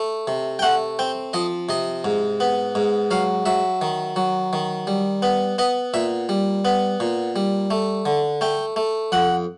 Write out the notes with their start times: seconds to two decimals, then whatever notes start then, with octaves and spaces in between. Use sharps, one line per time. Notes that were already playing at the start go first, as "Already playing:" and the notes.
Already playing: A3
0.27 C3
0.59 G5
0.62 A3 F#5
0.99 C4 G5
1.33 F3 D#5
1.69 C3 D#5
2.05 G#2
2.40 B3
2.75 G#2
3.11 F#3 F5
3.46 F#3 E5
3.81 D#3
4.16 F#3
4.53 D#3
4.87 G3
5.22 B3
5.58 B3 D#5
5.94 A#2 E5
6.29 G3
6.65 B3
7.00 A#2
7.36 G3
7.71 A3
8.06 D3
8.41 A3 G5
8.76 A3
9.12 F2 F#5